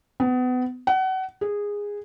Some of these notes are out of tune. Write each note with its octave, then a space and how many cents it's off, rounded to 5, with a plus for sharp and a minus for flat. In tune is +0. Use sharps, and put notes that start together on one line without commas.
B3 +30
F#5 +30
G#4 -15